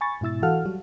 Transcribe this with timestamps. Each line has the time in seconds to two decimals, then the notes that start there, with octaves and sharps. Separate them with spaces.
0.01 G#5 B5 C#6 A6
0.21 G#2 B2 E4 E6 A6
0.42 E3 F#4 A4 F5 F#5 F6
0.65 F#3 G3 F#4